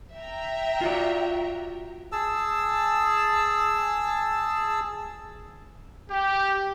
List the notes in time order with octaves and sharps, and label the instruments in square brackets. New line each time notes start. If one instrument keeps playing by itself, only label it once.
[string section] E5 G5 A#5
[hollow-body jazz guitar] F4 F#4 D5
[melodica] G#4 A5 E6
[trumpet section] G4